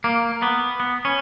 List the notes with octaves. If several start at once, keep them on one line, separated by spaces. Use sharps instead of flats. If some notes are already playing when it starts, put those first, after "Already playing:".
A#3
B3
B3
C#4